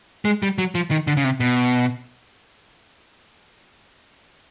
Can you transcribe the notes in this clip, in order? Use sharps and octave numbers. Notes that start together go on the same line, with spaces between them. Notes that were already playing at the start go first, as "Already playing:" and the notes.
G#3
G3
F#3
F3
D#3
D3
C#3
C3
B2